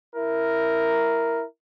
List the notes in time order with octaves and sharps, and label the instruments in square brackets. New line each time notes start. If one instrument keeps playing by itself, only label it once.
[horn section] E4 A#4